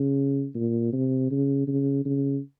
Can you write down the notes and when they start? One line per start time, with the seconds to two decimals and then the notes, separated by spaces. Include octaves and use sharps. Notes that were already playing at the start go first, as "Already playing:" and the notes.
Already playing: C#3
0.55 A#2
0.93 C3
1.31 C#3
1.67 C#3
2.05 C#3